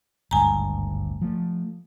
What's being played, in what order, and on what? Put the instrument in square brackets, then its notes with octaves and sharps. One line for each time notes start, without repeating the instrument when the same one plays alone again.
[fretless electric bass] G#1 D2 G2 [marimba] G#5 A#5
[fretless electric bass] F3 A3